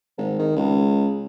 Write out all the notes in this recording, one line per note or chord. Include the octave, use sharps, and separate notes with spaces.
G#1
D#3
C#2